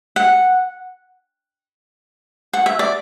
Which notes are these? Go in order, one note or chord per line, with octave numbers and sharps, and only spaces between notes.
F#5
F#5
E5
D5